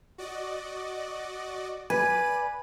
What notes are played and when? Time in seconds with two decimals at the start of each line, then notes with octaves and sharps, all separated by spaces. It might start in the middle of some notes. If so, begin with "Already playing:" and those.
0.18 F#4 D5 D#5
1.90 B4 D5 G#5 D#7